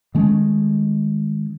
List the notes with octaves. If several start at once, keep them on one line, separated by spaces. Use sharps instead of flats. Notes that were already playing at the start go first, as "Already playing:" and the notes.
D#3 G#3 A3 C#4